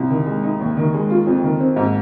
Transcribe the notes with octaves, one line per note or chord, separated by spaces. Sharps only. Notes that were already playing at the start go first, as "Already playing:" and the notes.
Already playing: C2
D#3
G#3
D#4
D#2
D#3
G#3
F4
F2
D#3
C4
G#2